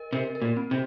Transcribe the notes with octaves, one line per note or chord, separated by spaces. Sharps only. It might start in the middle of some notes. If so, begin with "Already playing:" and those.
Already playing: A#4 D#5
C3 A#4
A#4
A#2
C4
C3